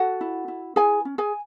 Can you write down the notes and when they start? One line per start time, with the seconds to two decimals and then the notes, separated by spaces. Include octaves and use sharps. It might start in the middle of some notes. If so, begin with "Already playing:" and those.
Already playing: F#4 A4 F#5
0.21 E4
0.48 E4
0.76 E4 G#4 G#5
1.05 C#4
1.18 G#4 G#5